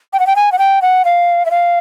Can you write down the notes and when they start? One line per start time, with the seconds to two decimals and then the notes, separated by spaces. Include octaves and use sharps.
0.13 G5
0.20 F#5
0.27 G5
0.36 G#5
0.52 F#5
0.59 G5
0.82 F#5
1.05 F5
1.46 E5
1.51 F5